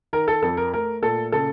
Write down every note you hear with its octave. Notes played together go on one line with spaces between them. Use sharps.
D#3 A#4
A4
F2 A4
A#4
A3 A#4
A#2 A4
C#3 A4